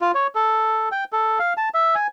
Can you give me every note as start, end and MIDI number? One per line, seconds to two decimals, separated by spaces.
0.01 0.12 65
0.15 0.27 73
0.35 0.89 69
0.92 1.04 79
1.12 1.39 69
1.39 1.53 77
1.57 1.69 81
1.74 1.95 76
1.95 2.07 80